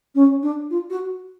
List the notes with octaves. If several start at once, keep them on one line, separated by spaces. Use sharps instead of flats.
C#4
D4
F4
F#4